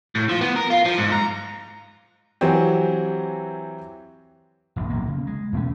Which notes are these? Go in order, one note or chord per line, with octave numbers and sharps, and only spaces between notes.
A2
F3
B3
A#4
F4
F3
G#2
A#5
E3 F#3 C4 G4
F1 A#1 G2
D1 B1 A#3
C#3
G#3
E2 B2 A3 C#4